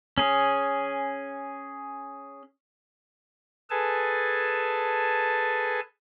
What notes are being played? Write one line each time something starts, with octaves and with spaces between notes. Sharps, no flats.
C#4 G#4
G#4 A4 B4 G#5 A5